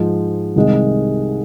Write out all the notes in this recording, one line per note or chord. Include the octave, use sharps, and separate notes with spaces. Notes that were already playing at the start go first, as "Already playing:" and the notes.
Already playing: G#2 F3 G#3
C2 C3 D#3 G#3